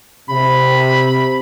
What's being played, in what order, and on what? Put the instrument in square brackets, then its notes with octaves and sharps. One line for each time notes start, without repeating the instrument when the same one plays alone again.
[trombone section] C3 [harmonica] B5